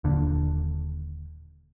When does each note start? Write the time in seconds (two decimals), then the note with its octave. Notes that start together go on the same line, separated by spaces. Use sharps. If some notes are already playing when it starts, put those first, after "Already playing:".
0.04 D#1 A#2 D3